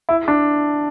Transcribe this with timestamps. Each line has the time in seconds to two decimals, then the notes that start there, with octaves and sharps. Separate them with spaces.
0.09 E4
0.28 D4